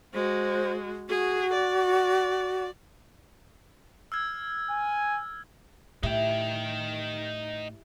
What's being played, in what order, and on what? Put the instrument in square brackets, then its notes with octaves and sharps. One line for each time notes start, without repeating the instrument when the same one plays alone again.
[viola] G#3 F#4 [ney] C5
[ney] F#4 [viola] G#4
[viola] D5
[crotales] E6 F6 G#6
[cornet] G#5
[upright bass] A2 [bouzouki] G3 E4 E5 [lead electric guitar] D#4 G5